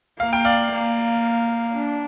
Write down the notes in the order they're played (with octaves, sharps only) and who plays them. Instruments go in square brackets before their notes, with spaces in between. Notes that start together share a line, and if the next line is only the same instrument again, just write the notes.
[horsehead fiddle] A#3 [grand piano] F5
[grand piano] G5
D5 F5
[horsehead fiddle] A#3
D4